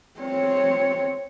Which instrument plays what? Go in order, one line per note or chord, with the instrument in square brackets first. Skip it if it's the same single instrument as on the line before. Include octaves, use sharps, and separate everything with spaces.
[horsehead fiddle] C4 C#5